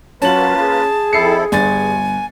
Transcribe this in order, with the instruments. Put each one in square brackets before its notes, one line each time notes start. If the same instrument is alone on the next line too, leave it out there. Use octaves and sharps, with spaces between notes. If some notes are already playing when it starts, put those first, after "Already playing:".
[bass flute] F#3 [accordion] A#3 F4 B4 [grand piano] C#4 F#7 [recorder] A5
[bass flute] G#4
[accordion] F2 E4 A4 [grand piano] C7 C#7
[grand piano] G1 A6 [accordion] G2 [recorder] G#5